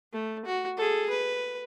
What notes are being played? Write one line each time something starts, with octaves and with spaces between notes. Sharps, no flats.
A3
F#4
G#4 A4
B4